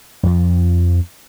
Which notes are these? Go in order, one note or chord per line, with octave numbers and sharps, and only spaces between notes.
F2 F3